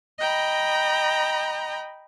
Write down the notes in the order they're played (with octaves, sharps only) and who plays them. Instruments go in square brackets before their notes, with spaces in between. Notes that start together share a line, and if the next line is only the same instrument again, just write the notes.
[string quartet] D#5 G5 A#5 B5